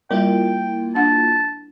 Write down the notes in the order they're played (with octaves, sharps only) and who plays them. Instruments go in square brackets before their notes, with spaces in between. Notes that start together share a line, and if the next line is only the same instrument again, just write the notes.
[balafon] G3 [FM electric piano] A#3 E4 F4 [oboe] G5
[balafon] D4 F#5 [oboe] A5